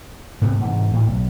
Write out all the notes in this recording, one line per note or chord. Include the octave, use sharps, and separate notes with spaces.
G#2 C3 A3 B3
G#2 C3 E3
D2 A2
B1